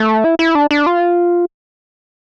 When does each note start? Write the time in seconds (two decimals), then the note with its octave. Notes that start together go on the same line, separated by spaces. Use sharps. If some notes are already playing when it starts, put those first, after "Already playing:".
Already playing: A3
0.24 E4
0.39 E4
0.55 D4
0.71 D4
0.86 F4